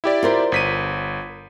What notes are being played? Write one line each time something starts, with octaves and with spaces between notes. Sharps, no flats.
E4 G4 D5
F4 A#4 C5
G1 B6 D#7